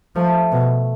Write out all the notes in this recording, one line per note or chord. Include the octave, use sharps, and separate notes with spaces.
F3 A3
B2